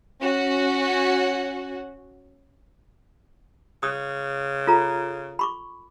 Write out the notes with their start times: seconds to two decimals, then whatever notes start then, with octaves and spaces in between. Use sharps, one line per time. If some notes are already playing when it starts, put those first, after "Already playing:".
0.22 C#4 F#4
3.83 C#3 D#6
4.67 F4 A4 A#5
5.39 B5 C#6 D6